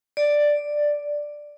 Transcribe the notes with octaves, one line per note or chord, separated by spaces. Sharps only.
D5